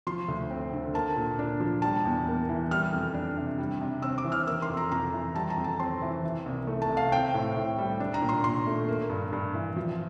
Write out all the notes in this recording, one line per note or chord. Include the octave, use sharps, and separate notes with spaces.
F3 C6
D2
C4
D3
A#3 A5
A#2
D4
F3
G3 A5
E2
A#3
E3
G3 F6
F2
D4
C3
G3
C3
C4 E6
D6
E3
F6
A#3 E6
C6
F2
A#5
F2 A#5
E3
G3 A5
A#5
F2
A5
C4 C6
E3
E3
C2
A3
A5
C3
F5
C4 G5
A2
A2
G3
D4
A#5
A#2
C6
A#2 C6
A3
A#3
G2
G2
E3
F3